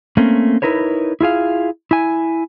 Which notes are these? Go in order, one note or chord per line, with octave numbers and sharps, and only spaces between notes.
A3 A#3 C4 C#4
D#4 E4 A#4 B4 C#5
E4 F4 G#4 F5
E4 G#5